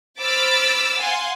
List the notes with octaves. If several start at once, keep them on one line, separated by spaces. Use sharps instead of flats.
C5 B5 D6 E6 F6 A6
F5 F#5 G#5 C6